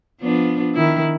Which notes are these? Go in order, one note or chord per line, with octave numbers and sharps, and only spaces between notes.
F3 B3 D4
D#3 E4